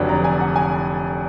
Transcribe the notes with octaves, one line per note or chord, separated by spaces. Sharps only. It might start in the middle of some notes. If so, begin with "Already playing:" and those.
Already playing: F1 F2 D3 F#3 B4 D5
A#5
G#5
F#5
G#5